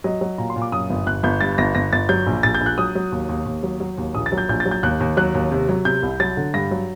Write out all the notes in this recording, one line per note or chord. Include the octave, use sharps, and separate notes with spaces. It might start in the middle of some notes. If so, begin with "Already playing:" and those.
F#3 D#5
F#3
A#2 A#5
C6
A#2
D6
F#2 D#6
G1
G1 F#6
G1 G6
G2 A6
G1 A#6
G1 A#6
G1 A6
F#3 G6
A#1
A#1 A6
G6
A#1
F#6
F#3 D#6
F#3
D#2
D#2
D#2
F#3
F#3
D#2
A#1 D#6
A6
F#3
G6
A#1 G6
A6
F#3
G6
D#2 F#6
D#2
F#3 F#6
D#2
C3
F#3
C3 G6
C2
F#3 A6
D3
G2 A#6
F#3